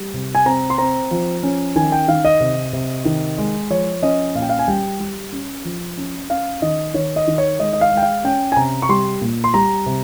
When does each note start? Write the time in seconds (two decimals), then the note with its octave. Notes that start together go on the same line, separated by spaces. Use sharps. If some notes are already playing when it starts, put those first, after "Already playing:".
Already playing: G3
0.14 C3
0.35 G#5
0.46 C4 A#5
0.70 C6
0.78 C4 A#5
1.11 F3
1.43 C#4
1.76 D#3 G#5
1.92 G5
2.08 D#3 F5
2.25 D#5
2.40 C3
2.73 C3
3.05 D#3
3.38 G#3
3.70 F3 C#5
4.03 C#4 D#5
4.35 A#2 F5
4.42 G5
4.49 F5
4.59 G#5
4.68 G3 G5
5.00 G3
5.33 C#4
5.65 F3
5.98 C#4
6.29 C#4 F5
6.62 D#3 D#5
6.94 D#3 C#5
7.16 D#5
7.28 D#3
7.38 C#5
7.60 G#3 D#5
7.73 D#5
7.81 F5
7.92 G#3
7.97 G5
8.03 F5
8.24 C#4 G5
8.52 G#5
8.56 C3 A#5
8.82 C#6
8.89 G3 C6
9.21 A#2
9.44 C6
9.54 G3 A#5
9.86 C3